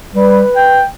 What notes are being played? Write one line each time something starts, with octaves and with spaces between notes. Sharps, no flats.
G3 B4
G5